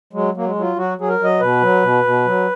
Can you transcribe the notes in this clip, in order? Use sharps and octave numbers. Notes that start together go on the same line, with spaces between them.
F#3 G#3
F#3 A#3
G#3
F#3
F4
F#3 F#4
F#3 G#4
A#4
F#3
D#5
B2 B4
F#3
B2
B2
F#3